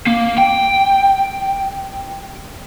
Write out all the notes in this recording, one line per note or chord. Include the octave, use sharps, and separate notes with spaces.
A#3
G5